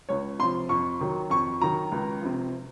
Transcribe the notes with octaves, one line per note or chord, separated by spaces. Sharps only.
C#2 C#5
C3 F3 C6
F2 C#6
D#3 F#3
F2 C#6
D#3 F#3 A#5
C#2
C3 F3